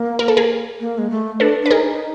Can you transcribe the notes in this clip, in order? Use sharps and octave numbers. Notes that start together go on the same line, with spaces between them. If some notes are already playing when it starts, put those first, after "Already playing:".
Already playing: A#3
A#4
A4
G#4 A#4
A#3
G#3
A3
D4 A4 B4
D4 B4
D#4 G#4 A#4
D#4